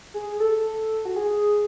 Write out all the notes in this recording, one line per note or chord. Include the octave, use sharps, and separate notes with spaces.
G#4
A4
F#4
G#4